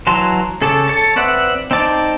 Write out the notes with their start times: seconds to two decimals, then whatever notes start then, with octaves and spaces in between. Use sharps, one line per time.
0.07 E3 F#3 A5 A#5 C6
0.61 C#3 A4 C#5 A5 D6
0.88 A4 C#5 A5
1.16 C4 B4 D5 E5 F#5
1.71 C4 D#4 D5 A5 D6